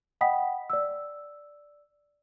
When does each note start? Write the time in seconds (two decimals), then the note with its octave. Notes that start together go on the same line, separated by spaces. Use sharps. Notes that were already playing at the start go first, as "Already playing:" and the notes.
0.21 D#5 F#5 G5 B5 D#6 B6
0.70 D5 E6